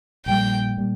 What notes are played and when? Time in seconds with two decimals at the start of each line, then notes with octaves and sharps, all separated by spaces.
0.26 A#1 A#2 G3 G5
0.77 A#2 G3